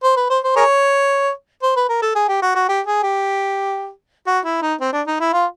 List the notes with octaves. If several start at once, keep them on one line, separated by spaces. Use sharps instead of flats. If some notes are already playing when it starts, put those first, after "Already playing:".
C5
B4
C5
C5
G#4 A#4 C#5
C5
B4
A#4
A4
G#4
G4
F#4
F#4
G4
G#4
G4
F#4
E4
D#4
C4
D4
D#4
E4
F4